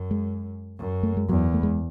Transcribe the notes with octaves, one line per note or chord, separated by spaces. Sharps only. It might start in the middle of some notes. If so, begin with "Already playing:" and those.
Already playing: F#2
G#3
F#2
A3
G#3
E2 F#3
A3
G#3